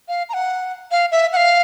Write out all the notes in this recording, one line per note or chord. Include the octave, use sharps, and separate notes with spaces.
F5
A#5
F#5
F5
E5
F#5
F5